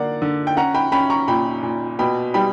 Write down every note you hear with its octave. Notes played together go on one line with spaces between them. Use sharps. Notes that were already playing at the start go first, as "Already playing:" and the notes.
Already playing: D3 A#3 D5 F#5
D3
G5
C#4 F#5 A#5
G5 B5
C#4 G5 B5
A#5 C#6
A#2 G5 B5
A#2
B2 G5 B5
G3 G5 B5